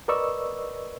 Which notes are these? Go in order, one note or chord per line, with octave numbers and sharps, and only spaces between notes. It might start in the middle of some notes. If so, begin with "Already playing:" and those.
A#4 B4 D5 D#5 C#6 E6